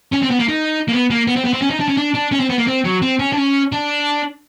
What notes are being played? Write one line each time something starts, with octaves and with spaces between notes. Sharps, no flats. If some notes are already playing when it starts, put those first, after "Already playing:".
C#4
C4
B3
A#3
D#4
A#3
B3
A#3
B3
C4
B3
C4
C#4
D#4
D4
C#4
D4
D4
C#4
C4
B3
A#3
C4
F#3
C4
C#4
D4
C#4
D4